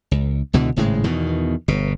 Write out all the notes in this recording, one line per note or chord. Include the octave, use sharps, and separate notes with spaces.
C#2
C#2 B2 D3 E3
G#1 A2 C#3 G#3
E2 B2 D#3
G1 B2